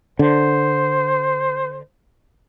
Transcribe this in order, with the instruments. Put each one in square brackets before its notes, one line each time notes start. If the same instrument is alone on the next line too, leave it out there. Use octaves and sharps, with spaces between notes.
[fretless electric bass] D3 [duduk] C5